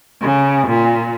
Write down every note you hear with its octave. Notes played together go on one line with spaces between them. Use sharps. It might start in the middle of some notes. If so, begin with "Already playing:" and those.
C#3
A#2